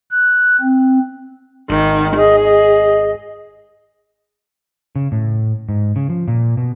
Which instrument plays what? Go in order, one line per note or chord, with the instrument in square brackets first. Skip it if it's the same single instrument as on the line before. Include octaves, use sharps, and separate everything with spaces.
[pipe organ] F#6
C4
[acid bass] G#1 [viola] D#3
[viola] G#4 [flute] D#5
[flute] D#5
[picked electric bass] C#3
A2
G#2
C#3
F3
A#2
B2